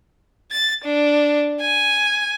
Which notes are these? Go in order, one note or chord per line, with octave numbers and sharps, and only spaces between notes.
A6
D4
G#5